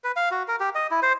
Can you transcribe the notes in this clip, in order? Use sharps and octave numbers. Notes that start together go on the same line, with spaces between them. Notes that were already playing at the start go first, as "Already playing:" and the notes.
B4
F5
F#4
A#4
G4
D#5
E4
C5